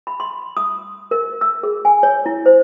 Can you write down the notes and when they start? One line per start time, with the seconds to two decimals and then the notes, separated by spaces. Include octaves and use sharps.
0.07 B5
0.20 C6
0.57 D#6
1.11 A#4
1.41 E6
1.63 G#4
1.85 G#5
2.03 C#5
2.26 E4
2.46 C5